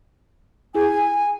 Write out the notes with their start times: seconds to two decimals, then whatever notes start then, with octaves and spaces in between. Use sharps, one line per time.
0.75 E4 G#4 G#5